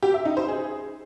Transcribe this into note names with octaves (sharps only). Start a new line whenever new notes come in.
G4
E5
D#4
C5
G#4